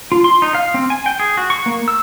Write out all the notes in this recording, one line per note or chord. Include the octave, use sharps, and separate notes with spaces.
F4
C6
D#4
F5
C4
G#5
G5
G#4
F#4
C#6
A#3
E6